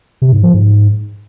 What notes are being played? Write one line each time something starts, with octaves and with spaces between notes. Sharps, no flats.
C3
G#2
F3
G#2